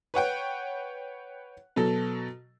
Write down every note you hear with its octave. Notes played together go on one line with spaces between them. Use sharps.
B4 C#5 F#5 G5
B2 F#3 A4